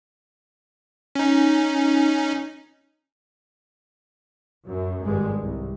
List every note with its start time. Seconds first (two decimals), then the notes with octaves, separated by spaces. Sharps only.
1.15 C#4 D#4
4.67 F#2
5.02 G#1 G2 G3 G#3
5.40 C2